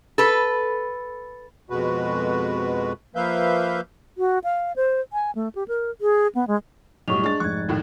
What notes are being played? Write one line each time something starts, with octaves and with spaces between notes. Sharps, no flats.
A4 B4
F2 B2 G#3 F#4 B4
F3 A#3 B4 E5 F5 G6
F#4
F5
C5
G#5
A3
G4
A#4
G#4
B3
G#3
B1 F#2 A2 G3 C#6 F7
G#3 D4 A6
F1 G#2 C#6 F#6 G#6
D#2 A2 D#3